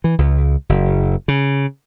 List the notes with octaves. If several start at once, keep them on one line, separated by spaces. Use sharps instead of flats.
E3
C#2
F#1
C#3